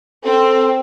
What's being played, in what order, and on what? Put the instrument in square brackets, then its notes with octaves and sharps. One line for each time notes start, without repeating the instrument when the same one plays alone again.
[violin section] C4 [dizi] A4